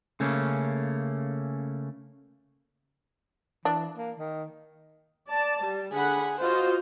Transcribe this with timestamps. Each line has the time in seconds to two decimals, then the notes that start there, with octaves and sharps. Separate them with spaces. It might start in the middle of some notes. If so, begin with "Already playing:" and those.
0.20 C#3 A3 A#3 C#4
3.65 E3 D4
3.97 A#3
4.19 D#3
5.29 D5 A5
5.61 G3
5.92 D3 G#4 F#5 B5
6.40 F4 F#4 C5 D#5